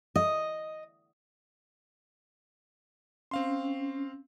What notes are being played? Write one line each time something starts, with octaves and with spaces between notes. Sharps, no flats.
D#5
C4 C#4 F5 C6